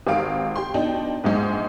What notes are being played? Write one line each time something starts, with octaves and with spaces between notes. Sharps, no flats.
G#1 D#3 G4 F5 D7
G4 G5 C6
B2 D4 D#4 G5
A#1 G#2 G#3